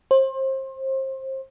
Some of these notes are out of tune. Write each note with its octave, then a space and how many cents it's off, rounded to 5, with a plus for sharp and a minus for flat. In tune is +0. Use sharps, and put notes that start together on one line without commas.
C5 +30